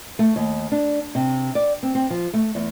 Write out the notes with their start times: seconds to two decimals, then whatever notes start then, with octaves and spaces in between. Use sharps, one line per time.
0.19 A3
0.36 D#2
0.72 D4
1.15 C3
1.55 D5
1.83 C4
1.95 C4
2.10 F3
2.34 A3
2.55 E2